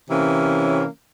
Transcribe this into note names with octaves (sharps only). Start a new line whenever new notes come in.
C3 E3 A#3 C#4